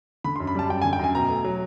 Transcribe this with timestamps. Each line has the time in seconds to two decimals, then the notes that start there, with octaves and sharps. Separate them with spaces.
0.24 D3 B5
0.36 C6
0.40 F#2
0.47 B5
0.55 G3 A5
0.69 F#2 G5
0.82 D3 G#5
0.93 G5
0.99 F#2 G#5
1.15 B2 A#5
1.29 A3
1.44 F#3